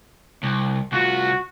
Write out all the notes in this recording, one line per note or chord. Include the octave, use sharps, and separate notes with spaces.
C2
C2 F4 F#4